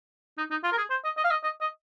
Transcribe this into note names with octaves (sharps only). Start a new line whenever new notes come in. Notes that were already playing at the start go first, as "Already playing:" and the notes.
D#4
D#4
F4
A#4
G#4
C5
D#5
D#5
F5
D#5
D#5
D#5